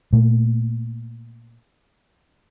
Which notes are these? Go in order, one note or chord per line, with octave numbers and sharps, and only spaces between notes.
A#2 A3